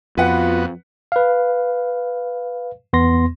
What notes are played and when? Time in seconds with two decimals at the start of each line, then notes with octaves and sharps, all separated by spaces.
0.18 F2 B3 F4 F#4 B4 F#5
1.12 B4 F5
2.93 E2 B3 C6 A#6